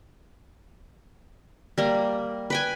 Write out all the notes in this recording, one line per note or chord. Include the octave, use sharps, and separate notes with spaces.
G3 A#3
B4 G5 G#5